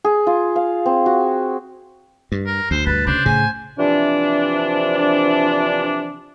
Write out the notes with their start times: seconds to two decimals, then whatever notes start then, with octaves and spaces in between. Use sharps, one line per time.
0.04 G#4
0.27 F4
0.56 F5
0.86 C4
1.06 F#4
2.32 G2
2.46 A#4
2.71 D2 C5
2.86 G2 D3 B4 A5
3.07 C#3 D4 C5
3.26 A2 C#3 G#5
3.78 C3 E3 F3 D4